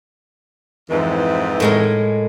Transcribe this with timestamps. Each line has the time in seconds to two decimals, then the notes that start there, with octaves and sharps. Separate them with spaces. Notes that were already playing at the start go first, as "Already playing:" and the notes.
0.90 F2 G#2 E3
1.60 A2 G#3 A#4